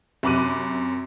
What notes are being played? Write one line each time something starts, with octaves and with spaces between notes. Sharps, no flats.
F#2 C3 B5 D6 F#6 D#7